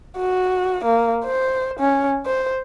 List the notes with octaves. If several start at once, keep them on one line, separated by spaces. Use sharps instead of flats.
F#4
A#3
C5
C#4
C5